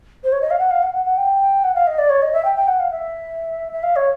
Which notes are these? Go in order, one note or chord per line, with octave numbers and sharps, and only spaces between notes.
C5
C#5
D#5
F5
F#5
F5
F#5
F#5
F#5
G5
F#5
F5
D#5
D5
C#5
D#5
E5
G5
G5
F#5
F5
E5
E5
F5
C#5